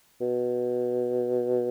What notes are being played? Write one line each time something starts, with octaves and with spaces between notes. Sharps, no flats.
B2